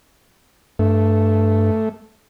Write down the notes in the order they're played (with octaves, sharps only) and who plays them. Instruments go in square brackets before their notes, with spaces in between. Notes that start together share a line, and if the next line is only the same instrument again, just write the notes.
[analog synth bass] G2 [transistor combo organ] A3